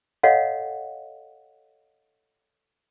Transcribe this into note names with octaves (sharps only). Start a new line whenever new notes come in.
A4 C#5 D#5 F5 F#5